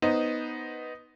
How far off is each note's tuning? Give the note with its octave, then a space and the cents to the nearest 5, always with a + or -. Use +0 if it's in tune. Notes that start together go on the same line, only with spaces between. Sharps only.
B3 +0 D#4 +0 C5 +0